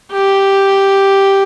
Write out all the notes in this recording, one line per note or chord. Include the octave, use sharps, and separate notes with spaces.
G4